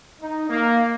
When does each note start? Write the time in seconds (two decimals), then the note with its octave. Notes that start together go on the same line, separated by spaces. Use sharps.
0.21 D#4
0.50 A#3